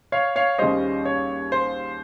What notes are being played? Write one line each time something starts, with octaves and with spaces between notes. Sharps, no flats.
C#5 F5
C#5 F5
D#2 C#3 G3 C5 D#5
C#5
C5